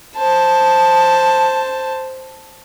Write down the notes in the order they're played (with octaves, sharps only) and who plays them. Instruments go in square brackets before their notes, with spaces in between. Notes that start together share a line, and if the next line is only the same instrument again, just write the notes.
[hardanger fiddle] C5 A5